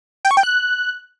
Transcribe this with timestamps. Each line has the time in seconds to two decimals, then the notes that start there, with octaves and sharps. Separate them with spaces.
0.25 G5
0.31 C#6
0.37 G5
0.43 F#6